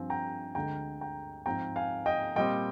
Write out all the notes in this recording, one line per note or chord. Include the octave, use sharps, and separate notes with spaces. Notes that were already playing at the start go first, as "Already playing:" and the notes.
Already playing: G2 F3 C4 G#5
G5 A#5
D2 D3 G#3 G5 A#5
G5 A#5
G#2 F3 C4 G5 A#5
F5 G#5
D#5 G5
A#2 G3 C4 D#5 G5